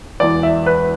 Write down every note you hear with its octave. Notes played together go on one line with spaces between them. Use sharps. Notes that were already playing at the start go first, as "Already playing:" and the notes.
E1 E2 E3 D5
E5
B4